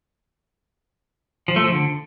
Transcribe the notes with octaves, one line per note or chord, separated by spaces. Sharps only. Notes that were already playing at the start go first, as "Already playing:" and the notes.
F3
A3
F3
D3